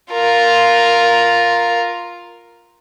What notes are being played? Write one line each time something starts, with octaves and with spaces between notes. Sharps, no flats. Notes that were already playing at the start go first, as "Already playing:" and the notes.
F4 A#4